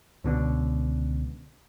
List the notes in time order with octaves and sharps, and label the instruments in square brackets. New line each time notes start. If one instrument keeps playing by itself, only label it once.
[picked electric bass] C#2 B2 D3